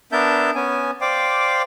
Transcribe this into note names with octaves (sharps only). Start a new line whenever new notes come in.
B3 D4 A#4 E5 A5 G6
B3 C#4 G#5
C5 D5 F5 G5 D6